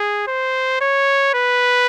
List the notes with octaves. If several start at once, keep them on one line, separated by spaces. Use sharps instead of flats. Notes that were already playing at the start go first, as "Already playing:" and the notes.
Already playing: G#4
C5
C#5
B4